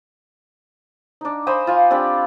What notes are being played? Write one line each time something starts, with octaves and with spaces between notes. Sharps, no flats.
D4 D#4
C5 D#5 G#5 B5
F4 G#5
C4 D4 G4 B5